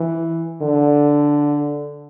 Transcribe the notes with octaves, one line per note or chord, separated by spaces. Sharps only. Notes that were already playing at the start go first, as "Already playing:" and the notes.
Already playing: E3
D3